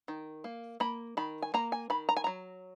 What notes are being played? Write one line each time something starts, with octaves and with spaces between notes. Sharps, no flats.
D#3
A#3
A#3 B5
D#3 B5
G#5
A#3 A#5
G#5
D#3 B5
A#5
G#5
F#3 A#5